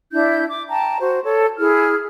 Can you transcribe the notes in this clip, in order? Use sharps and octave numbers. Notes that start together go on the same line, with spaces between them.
D4 E4 G6
D6
G5 A5 A#5
F#4 C5
A4 C#5
E4 G#4 F6